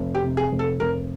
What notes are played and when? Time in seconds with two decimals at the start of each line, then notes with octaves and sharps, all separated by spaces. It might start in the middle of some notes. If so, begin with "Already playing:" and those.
Already playing: F1
0.15 G4
0.22 C3
0.37 G#4
0.52 F1
0.59 A4
0.80 F1 A#4